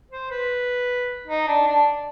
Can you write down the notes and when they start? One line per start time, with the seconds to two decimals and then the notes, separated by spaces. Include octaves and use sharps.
0.11 C5
0.31 B4
1.27 D#4
1.47 D4
1.67 D4